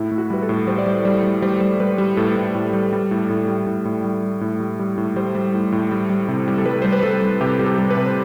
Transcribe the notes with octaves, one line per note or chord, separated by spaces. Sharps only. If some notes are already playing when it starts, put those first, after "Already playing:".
Already playing: A2 E4
A2
F#4
G3 B4
A4
A2
G3 C5
D5
G3 C5
G3 D5
G3
G3 C5
G3
G3 B4
G3
A2 A4
A2
A2
G3
G3
A2
A2
G3
A2
A2
G3
G3
A2
G3
G3
A2
G3 C5
G3
A2
A2
G3
G3
C3
G3
A4
G3 B4
G3 C5
B4
G3 A4
G3
C3 G4
G3
A4
G3
B4
C3
C5